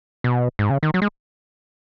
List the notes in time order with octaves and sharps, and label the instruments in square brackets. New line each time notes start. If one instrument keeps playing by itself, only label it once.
[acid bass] B2
G#2
C#3
D#3
F#3
G#3